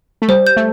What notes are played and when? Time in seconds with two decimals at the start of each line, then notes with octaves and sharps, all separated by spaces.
0.22 A3
0.28 G3 C5
0.47 G6
0.57 A3